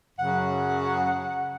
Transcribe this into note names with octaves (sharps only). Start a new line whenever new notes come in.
F#2 C#3 F#3 F#5